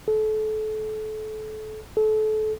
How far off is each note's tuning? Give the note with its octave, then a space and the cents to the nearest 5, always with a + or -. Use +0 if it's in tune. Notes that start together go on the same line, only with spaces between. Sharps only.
A4 -30
A4 -30